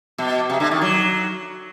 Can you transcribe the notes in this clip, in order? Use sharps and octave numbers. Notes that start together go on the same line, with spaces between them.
B2
C3
D3
D#3
F#3